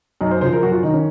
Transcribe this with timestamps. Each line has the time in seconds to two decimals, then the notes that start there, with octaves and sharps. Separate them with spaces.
0.21 F#2 D#4
0.31 C5
0.41 C#3 F3 C5
0.52 A#4
0.63 F#2 F#4
0.72 F4
0.83 D#3 D#4
0.93 C#4